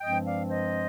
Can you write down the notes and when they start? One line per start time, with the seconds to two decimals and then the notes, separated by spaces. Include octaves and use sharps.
0.01 G2 F3 G#3 C4 D#5 G5
0.25 D5 F5
0.50 C5 D#5